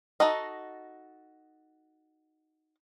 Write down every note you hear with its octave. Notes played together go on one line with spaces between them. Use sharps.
D#4 F#4 A4 D#5